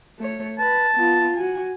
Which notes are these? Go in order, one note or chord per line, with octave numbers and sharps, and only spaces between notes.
A3 C#5
B4 A5
B3 F4
F#4 G#5